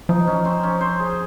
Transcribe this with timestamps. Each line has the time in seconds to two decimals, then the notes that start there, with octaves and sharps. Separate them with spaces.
0.09 F3 D#4
0.27 C#4
0.45 C4
0.63 C#4
0.81 C5
0.99 G#4